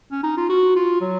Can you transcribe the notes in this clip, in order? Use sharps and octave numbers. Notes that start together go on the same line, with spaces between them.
C#4
D#4
F4
F#4
F4
F#3